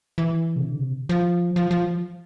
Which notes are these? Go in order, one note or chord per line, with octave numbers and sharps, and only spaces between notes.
E3
C3
D3
C3
F3
F3
F3